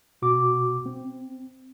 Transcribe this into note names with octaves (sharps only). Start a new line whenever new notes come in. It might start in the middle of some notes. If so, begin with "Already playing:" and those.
B2 F#4 D6
C4